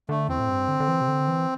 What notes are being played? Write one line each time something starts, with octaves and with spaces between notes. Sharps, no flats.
D3 A3
E2 C4
A2
G2
D3
D3
E3
C3
D3
E3